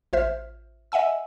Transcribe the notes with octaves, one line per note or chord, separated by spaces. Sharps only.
A1 F4 C5 E5 F6
D#5 E5 F#5 G#5 E6